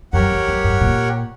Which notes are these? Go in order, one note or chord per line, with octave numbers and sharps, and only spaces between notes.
F#2 G4 A#4 C#5 F#5
E2
F#2
G2
A#2